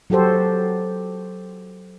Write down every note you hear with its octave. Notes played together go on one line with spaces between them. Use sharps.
F#3 F#4 G4 A4 C5